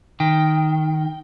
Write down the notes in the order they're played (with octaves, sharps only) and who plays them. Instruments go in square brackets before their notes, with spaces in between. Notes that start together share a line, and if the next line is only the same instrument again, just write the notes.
[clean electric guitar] D#3 [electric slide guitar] G5